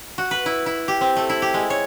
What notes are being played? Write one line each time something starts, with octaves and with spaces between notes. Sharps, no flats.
F#4
B4
E4
E4
G4
C4
A3
E4
G4
G#3
C#5